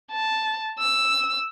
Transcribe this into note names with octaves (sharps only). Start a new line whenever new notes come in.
A5
E6